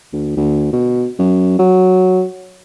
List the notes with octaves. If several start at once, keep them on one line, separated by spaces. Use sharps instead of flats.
D2
D2
B2
F#2
F#3